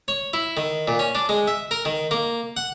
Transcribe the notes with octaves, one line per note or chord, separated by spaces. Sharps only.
C#5
E4
D#3
A#2
C#4
D4
G#3
E5
A#4
D#3
A#3
F#5